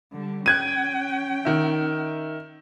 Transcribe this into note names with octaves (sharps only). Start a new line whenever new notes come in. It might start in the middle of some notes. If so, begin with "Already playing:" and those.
D3 G3
C#4 G5 F#6 G#6 D#7
D#3 E5